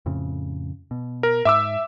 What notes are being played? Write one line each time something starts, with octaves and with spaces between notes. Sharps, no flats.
F2 A2 C#3
B2
A#4
G#2 E5 D6 E6